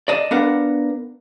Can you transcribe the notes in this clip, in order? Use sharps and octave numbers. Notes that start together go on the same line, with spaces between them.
D5 D#5 A5
B3 D4 A#4 F5 F#5